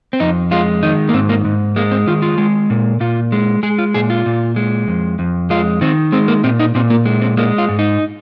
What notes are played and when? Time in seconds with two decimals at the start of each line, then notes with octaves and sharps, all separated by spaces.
0.13 C4
0.20 F2 D#4
0.51 G#3 F4
0.83 D#3 D#4
1.09 A#3
1.13 G#2 C4
1.29 A#3
1.45 G#2
1.76 G#3 A#3
1.92 C4
2.07 D#3 F4
2.22 F4
2.38 G#3
2.70 A#2
3.00 A#2 F4
3.32 G#3
3.63 G#3 G#4
3.78 F4
3.94 A#2 G#4
4.10 F4
4.26 A#2
4.56 G#3
4.88 F2
5.19 F2
5.50 G#3 F4
5.81 D#3 C4
6.12 G#3 C4
6.28 A#3
6.44 A#2 C4
6.60 D#4
6.75 A#2 C4
6.90 A#3
7.06 G#3
7.22 C4
7.37 G#3 A#3
7.58 F4
7.69 G#2
7.79 D#4